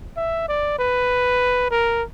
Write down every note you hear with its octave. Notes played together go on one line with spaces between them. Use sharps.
E5
D5
B4
A#4